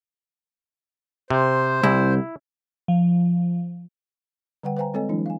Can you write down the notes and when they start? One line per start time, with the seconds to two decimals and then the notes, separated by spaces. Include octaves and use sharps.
1.31 C3 C5
1.83 C2 E4
2.88 F3
4.63 D3 G3 B4 F#5 G5
4.77 B4 C5 F5 G5 G#5 A#5
4.94 G#3 C4 A4 C#5 D#5 G#5
5.09 E3 F#3 G#3 D4 E4
5.26 F5 G#5